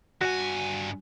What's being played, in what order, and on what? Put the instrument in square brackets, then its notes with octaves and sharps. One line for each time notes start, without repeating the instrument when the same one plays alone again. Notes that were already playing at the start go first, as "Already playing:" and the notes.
[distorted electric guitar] G2 G#5 [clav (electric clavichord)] F#4